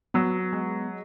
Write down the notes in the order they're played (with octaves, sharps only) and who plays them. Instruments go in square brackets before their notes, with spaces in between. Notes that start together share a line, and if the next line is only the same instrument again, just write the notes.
[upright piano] F#3 [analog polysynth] B3
[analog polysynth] G#3